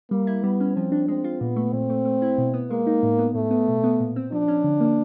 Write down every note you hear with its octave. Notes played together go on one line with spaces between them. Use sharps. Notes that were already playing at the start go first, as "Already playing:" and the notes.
G3 A#3
E4
G3 B3
C#4
F3 C4
D4
G#3 C4
F4
A#2 B3
A3
A#2 C4
A3
A3
E4
B2
B3
G#3 A#3
D#4
A2
B3
A2 A3
B3
B2
B3
A#2
C4
F3 D4
C#4
D3
A#3